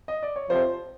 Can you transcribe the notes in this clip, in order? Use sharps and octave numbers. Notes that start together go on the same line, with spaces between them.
D#5
D5
C#5
F2 C3 F3 C5